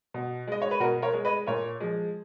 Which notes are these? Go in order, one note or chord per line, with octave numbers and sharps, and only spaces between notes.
B2
G#3 D#5
C#5
B4
B2 F#4 A#4
A#4 C#5
G#3
B4 D#5
A#2 A#4 C#5
F3 G#3